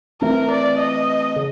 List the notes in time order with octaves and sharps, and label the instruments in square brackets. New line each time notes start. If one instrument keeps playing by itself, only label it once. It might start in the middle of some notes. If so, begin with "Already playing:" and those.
[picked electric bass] E3 A3 C4 [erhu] A#4
[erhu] D5
D#5
[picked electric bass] C#3